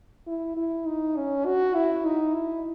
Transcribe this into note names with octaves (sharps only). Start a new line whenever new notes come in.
E4
E4
D#4
C#4
F#4
E4
D#4
E4